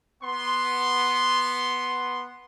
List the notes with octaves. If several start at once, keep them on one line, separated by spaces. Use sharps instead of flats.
B3 C6